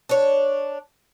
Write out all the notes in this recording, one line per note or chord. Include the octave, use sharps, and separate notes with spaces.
D4 C#5